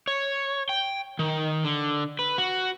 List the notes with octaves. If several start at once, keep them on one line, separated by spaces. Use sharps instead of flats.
C#5
G5
D#3
D3
B4
F#4